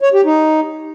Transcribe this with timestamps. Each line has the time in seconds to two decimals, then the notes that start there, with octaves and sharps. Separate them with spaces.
0.01 C#5
0.13 G4
0.25 D#4